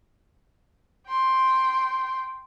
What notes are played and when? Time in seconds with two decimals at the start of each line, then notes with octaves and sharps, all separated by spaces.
1.08 G5 C6